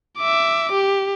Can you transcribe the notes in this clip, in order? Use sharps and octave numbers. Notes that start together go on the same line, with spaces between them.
E5 D6
G4